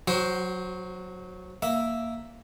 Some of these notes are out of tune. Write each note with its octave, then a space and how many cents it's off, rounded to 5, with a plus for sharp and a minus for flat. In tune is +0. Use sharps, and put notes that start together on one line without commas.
F#3 -10 F#4 +35 C5 +0
A#3 +0 E5 +0